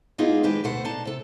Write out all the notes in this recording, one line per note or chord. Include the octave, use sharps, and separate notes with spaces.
G#3 A#3 B3 D#4 F4 G#4
F2 D#3 G#3 G4 B4
D2 B2 A3 A4 C5 F#5
D4 D#4 A5
C3 A4